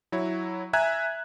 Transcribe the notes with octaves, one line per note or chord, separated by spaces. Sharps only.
F#3 E4 C#5
E5 G#5 A#5 F#6 G#6